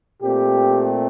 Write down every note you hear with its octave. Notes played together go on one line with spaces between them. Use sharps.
A#2 A3 C4 G4